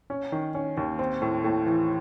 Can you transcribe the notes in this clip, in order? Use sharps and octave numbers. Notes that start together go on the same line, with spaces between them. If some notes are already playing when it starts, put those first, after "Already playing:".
C#4
D#3
C#4
D#2
C4
A2
A2
E3